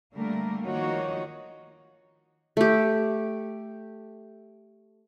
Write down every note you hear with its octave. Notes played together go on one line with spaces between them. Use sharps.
D3 G3 A3 A#3 A#4
D#3 F3 A#3 D#4 F#4 C#5
A3 G4